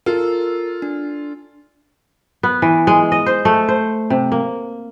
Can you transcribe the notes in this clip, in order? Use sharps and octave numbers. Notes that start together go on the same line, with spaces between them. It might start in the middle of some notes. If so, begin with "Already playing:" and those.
F4 A4 A#4
D4
B3
E3
G#3
D#5
C5
A3
C5
C3
A#3